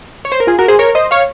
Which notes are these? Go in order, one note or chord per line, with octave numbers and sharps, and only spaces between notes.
C#5
C5
A#4
F4 G#4
F#4 A#4
G#4 C5
A#4 C#5
C5 D#5
C#5 F5